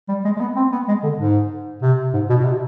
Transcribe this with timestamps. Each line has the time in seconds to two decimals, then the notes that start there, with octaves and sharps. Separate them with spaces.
0.08 G3
0.25 G#3
0.37 G#3
0.41 B3
0.56 C4
0.72 B3
0.88 G#3
1.03 D3
1.19 G#2
1.82 C3
2.14 G#2
2.30 B2
2.40 B2
2.44 C3